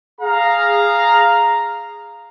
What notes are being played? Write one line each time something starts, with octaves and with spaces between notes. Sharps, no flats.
G#4 F5 A#5